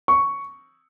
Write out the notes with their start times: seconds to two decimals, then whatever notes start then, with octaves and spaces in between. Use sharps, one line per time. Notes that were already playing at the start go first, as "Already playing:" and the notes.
0.08 C#6